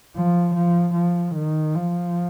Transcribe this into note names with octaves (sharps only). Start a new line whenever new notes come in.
F3
F3
F3
D#3
F3